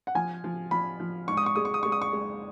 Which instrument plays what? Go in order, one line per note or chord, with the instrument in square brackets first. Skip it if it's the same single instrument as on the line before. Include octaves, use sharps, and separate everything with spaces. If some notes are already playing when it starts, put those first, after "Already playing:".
[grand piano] F#5
[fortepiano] F3 [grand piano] G#5
[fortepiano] F3
[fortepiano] F3 [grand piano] B5
[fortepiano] F3
[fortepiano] G#2 [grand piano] C#6
[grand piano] D#6
C#6
[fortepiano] G#3 [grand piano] D#6
[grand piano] C#6
D#6
[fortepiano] G#3 [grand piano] C#6
[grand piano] D#6
C#6
[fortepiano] G#3